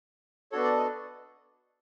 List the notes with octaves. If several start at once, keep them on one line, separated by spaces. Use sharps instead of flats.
B3 D4 F#4 A4 C#5
D5
D#5